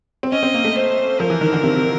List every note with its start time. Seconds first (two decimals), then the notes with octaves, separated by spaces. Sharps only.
0.23 C4
0.32 C#4 D#5
0.43 C4
0.54 A#3
0.65 A3
0.76 C5
1.19 F3 A#4
1.30 E3
1.41 D#3
1.52 D3
1.63 C3
1.76 C3